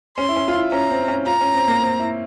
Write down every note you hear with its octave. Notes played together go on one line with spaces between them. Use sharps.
C#4 C6
E4
C#4
F4
E4
C#4 A#5
C4
C4
C#4
F4 A#5
C#4
C4
A#3
C4
E4